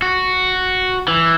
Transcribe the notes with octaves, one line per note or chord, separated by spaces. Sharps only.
F#4
E3